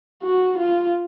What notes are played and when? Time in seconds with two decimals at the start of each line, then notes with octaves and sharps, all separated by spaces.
0.22 F#4
0.58 F4